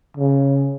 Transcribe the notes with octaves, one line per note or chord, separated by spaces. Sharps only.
C#3